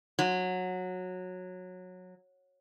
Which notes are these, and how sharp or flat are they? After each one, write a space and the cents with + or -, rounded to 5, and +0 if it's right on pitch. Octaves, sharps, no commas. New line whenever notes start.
F#3 -15